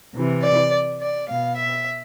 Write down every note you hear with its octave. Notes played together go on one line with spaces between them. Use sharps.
C3 E3
D5
D5
B2 F5
E5